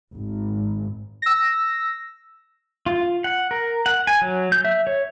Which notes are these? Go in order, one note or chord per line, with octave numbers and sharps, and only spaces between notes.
G#1
E6 A#6
F4
F#5
A#4
F#5
G#5
F#3
G6
E5
C#5